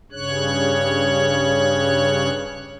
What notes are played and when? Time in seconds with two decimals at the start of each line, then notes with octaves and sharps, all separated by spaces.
0.12 G2 C#3 C#5 F#6